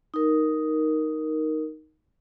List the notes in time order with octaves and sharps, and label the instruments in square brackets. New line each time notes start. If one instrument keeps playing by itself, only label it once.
[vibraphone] D#4 A#4